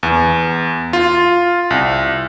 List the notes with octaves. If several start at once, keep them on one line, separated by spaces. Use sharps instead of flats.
E2
F4
C2